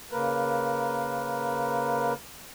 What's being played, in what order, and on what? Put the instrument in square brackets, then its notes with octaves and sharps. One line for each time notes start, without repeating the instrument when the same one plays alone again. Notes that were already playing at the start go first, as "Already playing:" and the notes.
[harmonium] C#3 A#3 A#4 B4